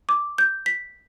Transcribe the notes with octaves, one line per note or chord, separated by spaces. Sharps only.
D6
G6
B6